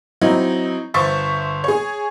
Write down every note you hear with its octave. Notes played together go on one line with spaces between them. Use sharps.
F#3 C4 D#4 E4
G1 C5 E5 C#6 A6
G#4 C#5